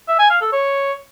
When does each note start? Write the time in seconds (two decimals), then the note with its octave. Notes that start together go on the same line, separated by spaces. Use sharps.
0.08 E5
0.19 G#5
0.30 F5
0.41 A4
0.52 C#5